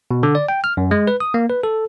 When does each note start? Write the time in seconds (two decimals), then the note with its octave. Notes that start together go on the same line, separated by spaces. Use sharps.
0.11 B2
0.23 D3
0.35 D5
0.49 G5
0.64 F6
0.77 F#2
0.91 G#3
1.07 B4
1.20 D#6
1.34 A#3
1.50 B4
1.63 A4